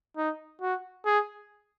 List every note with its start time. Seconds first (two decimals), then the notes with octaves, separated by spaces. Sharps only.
0.17 D#4
0.61 F#4
1.06 G#4